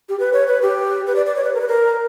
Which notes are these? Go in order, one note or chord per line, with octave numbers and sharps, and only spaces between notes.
G4
B4
C#5
B4
G4
B4
D5
D5
C#5
B4
A#4
B4
A#4